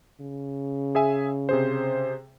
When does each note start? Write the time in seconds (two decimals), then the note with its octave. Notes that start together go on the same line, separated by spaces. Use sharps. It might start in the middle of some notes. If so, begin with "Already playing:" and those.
0.21 C#3
0.95 G#4 E5 G#5
1.49 C3 G#4 C5